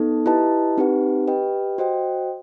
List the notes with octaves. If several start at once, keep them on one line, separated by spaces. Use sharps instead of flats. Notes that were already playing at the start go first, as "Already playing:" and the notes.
Already playing: B3 D#4 A4
E4 G4 B4 D#5 A5
C4 D#4 G4 B4 F#5
G4 B4 D#5 G5
F#4 C5 D#5 G5